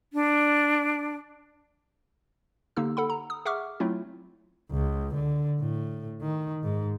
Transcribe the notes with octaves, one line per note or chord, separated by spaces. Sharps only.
D4
D3 A#3 D#4 G4 E6
A4 F#5 B5
A#5
D#6
G#4 E5 F#5 C#6 D6 F6
F#3 A3 C4 E4 F4
C#2
D3
A2
D#3
G#2